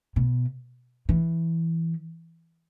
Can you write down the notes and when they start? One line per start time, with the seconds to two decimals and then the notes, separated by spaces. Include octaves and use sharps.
0.16 B2
1.09 E3